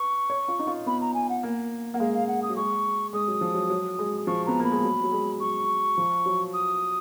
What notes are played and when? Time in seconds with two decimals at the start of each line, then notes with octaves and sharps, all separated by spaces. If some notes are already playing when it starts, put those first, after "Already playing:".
Already playing: B4 C#6
0.30 C#5
0.48 F4
0.59 D#4
0.67 F4
0.86 B3 B5
1.01 A#5
1.14 G#5
1.29 F#5
1.43 A#3
1.94 A#3 F#5
1.99 G#3 F5
2.14 F5
2.28 F#5
2.43 D#6
2.50 F#3
2.56 G#3 C#6
3.13 G#3 D#6
3.28 F#3
3.41 F3
3.54 F#3
3.70 F#3
3.99 G#3
4.27 F3 C#6
4.46 B3 A#5
4.60 A#3 B5
4.72 G#3
4.83 F#3
5.04 F#3
5.12 G#3
5.40 F#3 C#6
5.98 F3
6.26 F#3
6.54 D#6